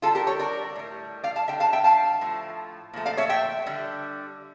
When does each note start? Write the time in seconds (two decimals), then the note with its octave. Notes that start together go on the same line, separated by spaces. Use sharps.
0.02 D3 G3 F4 A4
0.15 G4 A#4
0.27 A4 C#5
0.39 A#4 D5
0.76 A2 G3
1.23 D5 F5
1.36 F5 A5
1.48 D3 G3 E5 G5
1.60 F5 A5
1.73 E5 G5
1.84 F5 A5
2.21 A2 F3 A3
2.93 A#2 F3 A3
3.06 D5 F5
3.17 C#5 E5
3.29 E5 G5
3.66 D3 G3